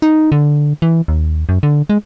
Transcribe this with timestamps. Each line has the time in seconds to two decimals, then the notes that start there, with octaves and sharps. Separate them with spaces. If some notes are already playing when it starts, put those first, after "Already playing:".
0.02 D#4
0.32 D3
0.82 E3
1.08 D#2
1.49 F#2
1.63 D3
1.90 G#3